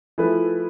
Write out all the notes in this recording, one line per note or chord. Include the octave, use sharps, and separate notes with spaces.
F3 A3 E4 G#4 B4